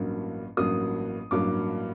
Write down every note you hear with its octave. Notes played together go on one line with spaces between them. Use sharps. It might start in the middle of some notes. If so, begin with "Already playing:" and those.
Already playing: A1 G2 F#3 A#3
A1 G2 F#3 A#3 D#6
A1 G2 F#3 A#3 D6